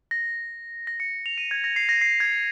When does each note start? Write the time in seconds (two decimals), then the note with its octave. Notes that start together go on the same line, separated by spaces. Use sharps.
0.11 A#6
0.87 A#6
1.00 C#7
1.26 F7
1.38 D#7
1.51 G#6
1.64 A#6
1.76 C7
1.89 A#6
2.01 C7
2.20 G#6